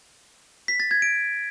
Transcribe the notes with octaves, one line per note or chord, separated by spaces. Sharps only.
B6
A6
G#6
D7